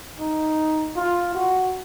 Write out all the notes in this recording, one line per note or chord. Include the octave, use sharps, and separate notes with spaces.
D#4
F4
F#4